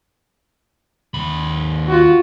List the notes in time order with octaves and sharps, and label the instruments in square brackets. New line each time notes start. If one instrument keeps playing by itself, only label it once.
[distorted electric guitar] D#2 B5
[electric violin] F4 F#4